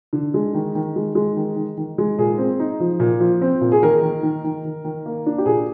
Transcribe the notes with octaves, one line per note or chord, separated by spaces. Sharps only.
D3
G#3
D#3
D#3
G#3
G#3
D#3
D#3
D#3
G#3
A#2 G#4
C4
D#4
F3
A#2
F3
C4
A#2
G#4
D#3 A#4
D#3
D#3
D#3
D#3
D#3
A#3
D4
G4
A#2 G#4